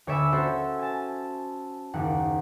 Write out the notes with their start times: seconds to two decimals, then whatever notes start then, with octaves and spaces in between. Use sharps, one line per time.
0.07 D2 C#5 D5 E5 G#5 B5
0.33 C#4 F#4 A4 C5
0.79 G#5 A5
1.93 F#1 D#2 F#5